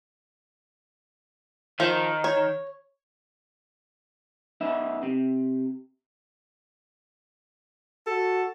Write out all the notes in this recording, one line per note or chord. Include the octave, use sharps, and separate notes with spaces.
D#3 F3
C#5
F#2 B3 D#4 E5
C3
F#4 A4